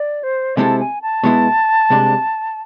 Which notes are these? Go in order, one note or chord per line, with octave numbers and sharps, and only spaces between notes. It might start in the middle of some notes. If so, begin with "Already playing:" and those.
Already playing: D5
C5
C3 G#3 C4 E4 A4 A5
G#5
A5
B2 G#3 B3 E4
C2 C3 G#3 D4